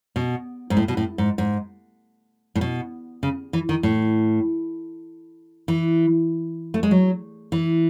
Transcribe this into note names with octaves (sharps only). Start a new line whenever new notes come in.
B2
G#2
A2
B2
A2
G#2
G#2
A2
B2
C#3
E3
D#3
A2
E3
A3
G#3
F#3
E3